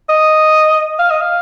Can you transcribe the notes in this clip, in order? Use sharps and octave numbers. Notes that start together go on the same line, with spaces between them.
D#5
F5
D#5
F5